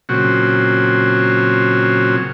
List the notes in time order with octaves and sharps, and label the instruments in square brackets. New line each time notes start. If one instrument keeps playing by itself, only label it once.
[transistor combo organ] A#2 C#3 F#3 C4 F#4